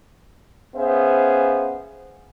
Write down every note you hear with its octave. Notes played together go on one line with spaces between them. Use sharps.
B3 C#4 G#4 C5 E5 F5